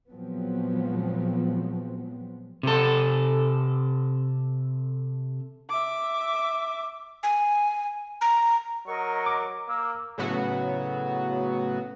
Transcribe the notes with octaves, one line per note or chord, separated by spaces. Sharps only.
A#2 F3 F#3 G#3 B3 C4
C3 A4
E5 D6
G#5
A#5
F#3 A#4 D#5 C#6
D6
A#3 E6
A2 C#3 F#3 B3 F#4